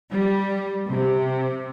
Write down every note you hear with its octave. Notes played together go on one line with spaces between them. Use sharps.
G3
C3